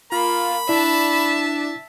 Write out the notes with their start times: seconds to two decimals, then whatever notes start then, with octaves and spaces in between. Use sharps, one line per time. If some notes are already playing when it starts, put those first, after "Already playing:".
0.12 A#3 F4 B5
0.69 D4 E4 E5 A5